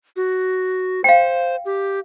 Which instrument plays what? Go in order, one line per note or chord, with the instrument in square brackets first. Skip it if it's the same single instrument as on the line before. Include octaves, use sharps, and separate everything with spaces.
[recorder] F#4
[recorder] C5 [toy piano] F5 G5
[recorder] G4